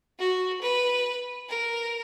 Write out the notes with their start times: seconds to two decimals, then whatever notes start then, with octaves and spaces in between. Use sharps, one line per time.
0.19 F#4
0.61 B4
1.49 A#4